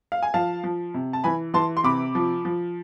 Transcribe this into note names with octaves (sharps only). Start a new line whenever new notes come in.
F5
G#5
F3 F5 A5
F3
C3
A5
E3 G#5 B5
E3 A5 C6
C6
C3 B5 D6
F3
F3